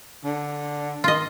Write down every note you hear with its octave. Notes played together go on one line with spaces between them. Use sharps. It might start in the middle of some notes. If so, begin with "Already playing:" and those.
D3
D#3 F4 D#5